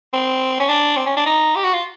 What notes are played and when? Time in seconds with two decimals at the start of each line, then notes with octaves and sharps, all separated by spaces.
0.13 C4
0.60 C#4
0.69 D4
0.96 C4
1.06 C#4
1.16 D4
1.26 D#4
1.55 G4
1.64 F#4
1.73 F4